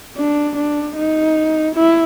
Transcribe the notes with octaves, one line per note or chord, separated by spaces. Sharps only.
D4
D4
D#4
E4